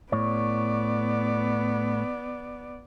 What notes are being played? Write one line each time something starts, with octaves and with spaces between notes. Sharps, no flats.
A2 B3 C#5 D5